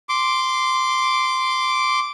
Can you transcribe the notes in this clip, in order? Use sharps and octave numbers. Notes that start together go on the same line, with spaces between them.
C6 D6